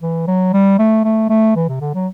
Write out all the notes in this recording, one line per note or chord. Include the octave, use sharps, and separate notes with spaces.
E3
F#3
G3
A3
A3
A3
E3
C3
D3
F#3